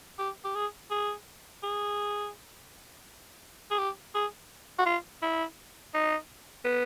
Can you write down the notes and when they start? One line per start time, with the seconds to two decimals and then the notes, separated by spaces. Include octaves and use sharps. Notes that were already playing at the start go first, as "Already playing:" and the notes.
0.19 G4
0.44 G4
0.55 G#4
0.91 G#4
1.63 G#4
3.71 G#4
3.78 G4
4.15 G#4
4.79 F#4
4.86 F4
5.22 E4
5.94 D#4
6.65 B3